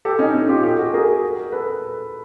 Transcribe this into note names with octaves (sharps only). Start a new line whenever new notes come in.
G4 A4
C#4 D#4
C#4
F4 G4
G4 A4
F#4 G#4
G#4 A#4
A4 B4